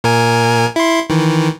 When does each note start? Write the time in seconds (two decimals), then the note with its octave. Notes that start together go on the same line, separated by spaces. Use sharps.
0.04 A#2 A#4 G#5
0.76 E4 C6
1.10 D#3 E3